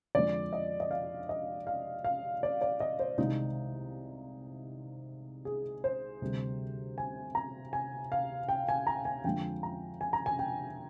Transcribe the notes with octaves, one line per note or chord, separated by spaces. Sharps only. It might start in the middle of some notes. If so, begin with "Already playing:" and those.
F2 D3 G#3 D5
D#5
D#5
F5
D#5
F5
F5
D5
D5
D#5
C5
C2 C3 D#3 G#3 D#4
G#4
C5
D2 C3 G3
G#5
A#5
G#5
F5
G5
G#5
A#5
G#5
F2 D3 F3 G#3 G5
A#5
G#5
A#5
G#5
G5